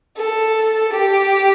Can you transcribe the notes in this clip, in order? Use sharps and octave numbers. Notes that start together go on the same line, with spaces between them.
A4
G4